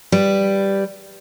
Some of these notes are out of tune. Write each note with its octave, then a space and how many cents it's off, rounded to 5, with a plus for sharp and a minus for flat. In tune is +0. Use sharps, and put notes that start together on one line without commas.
G3 +0 B4 +0